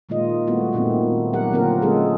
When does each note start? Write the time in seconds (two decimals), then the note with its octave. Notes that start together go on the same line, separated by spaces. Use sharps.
0.09 A#2 D#3 G#3 A#3 F4 D#5
0.47 G3 A3 B3 E4 F#4
0.73 A#2 D#3 A3 B3 C4
1.33 F#3 G4 A#4 F#5
1.52 D3 A#3 C4 F4 A#4
1.82 D3 G#3 A3 C#4 G#4 A4